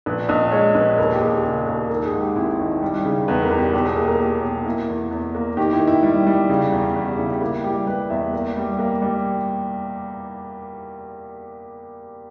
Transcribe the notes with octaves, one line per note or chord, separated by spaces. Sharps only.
A#1 B4
A#1 D#5
G#3 C#5
A#1 B4
D#2 A#4
G4
D#2 G#4
C#3
D#2 A#4
D#3 A#4
G#4
G#2
G4
G#1 E4
D#3
G3
C#3
E2 B4
A#4
E2
G4
B1 G4
G#4
A#3 G#4
A#4
A#3 G4
B1
A#3 E4
E2
E2
A#3
D#3 G4
E4
D#3
E4
G3
G3
C#3
E2
E2
G4
C#3 E4
G4
A#3 E4
G3 G4
G3 B4
E2 E5
A#3
G3
A#3
G3